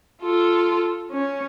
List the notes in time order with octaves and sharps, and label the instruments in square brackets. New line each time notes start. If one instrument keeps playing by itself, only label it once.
[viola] F4 A4
C#4